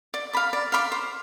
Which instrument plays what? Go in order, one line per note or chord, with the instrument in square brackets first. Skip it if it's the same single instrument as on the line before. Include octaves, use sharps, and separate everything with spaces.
[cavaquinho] D5
F5 B5 D6
D5
F5 B5 D6
C5